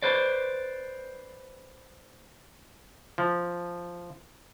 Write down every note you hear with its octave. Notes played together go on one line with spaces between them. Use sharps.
B4 C5 D5
F3